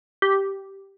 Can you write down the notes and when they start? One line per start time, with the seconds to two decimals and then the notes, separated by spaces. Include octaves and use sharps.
0.22 G4